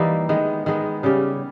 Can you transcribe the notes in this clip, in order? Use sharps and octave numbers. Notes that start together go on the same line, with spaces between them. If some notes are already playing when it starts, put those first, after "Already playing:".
Already playing: E3 G3 A#3 D#4
D#3 G#3 B3
D#3 G#3 B3
C#3 G3 C#4 G4